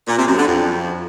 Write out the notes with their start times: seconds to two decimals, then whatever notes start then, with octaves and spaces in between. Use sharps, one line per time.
0.08 A#2
0.17 C3
0.27 F#2
0.37 D3
0.47 F2